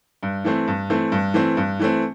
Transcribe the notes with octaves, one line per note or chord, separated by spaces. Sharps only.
G2
E3 A3 C4
G2
E3 A3 C4
G2
E3 A3 C4
G2
E3 A3 C4